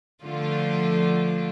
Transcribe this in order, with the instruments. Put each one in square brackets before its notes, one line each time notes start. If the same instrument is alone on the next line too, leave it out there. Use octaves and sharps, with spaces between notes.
[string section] D3 F3 A3 F4